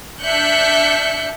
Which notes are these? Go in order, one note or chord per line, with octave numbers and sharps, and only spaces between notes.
D4 E5 F#6 G6 C#7